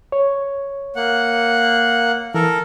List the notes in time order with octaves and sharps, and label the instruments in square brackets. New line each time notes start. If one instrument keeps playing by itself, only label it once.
[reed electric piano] C#5
[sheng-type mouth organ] A#3 F#5
[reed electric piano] E3 [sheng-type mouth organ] A4 A#4